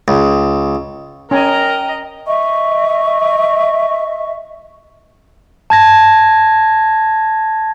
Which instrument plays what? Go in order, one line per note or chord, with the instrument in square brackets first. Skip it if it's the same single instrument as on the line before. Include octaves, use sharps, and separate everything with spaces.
[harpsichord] C#2
[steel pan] C#4 G#5 [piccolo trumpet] A#4 [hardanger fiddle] D#5 A#5 [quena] G5
[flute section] D#5 E5 C#6
[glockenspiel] A5 G#6 A#6